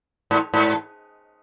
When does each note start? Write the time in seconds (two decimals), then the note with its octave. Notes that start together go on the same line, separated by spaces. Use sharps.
0.31 G#2
0.54 G#2